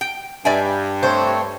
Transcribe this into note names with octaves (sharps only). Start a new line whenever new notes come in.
G5
G2 D5 E5 G#5
A3 C4 C5 C#5